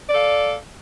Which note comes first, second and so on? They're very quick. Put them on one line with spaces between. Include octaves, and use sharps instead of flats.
D5 A4 F5